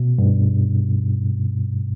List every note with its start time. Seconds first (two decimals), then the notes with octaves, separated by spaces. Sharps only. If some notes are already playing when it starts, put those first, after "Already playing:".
Already playing: B2
0.18 G2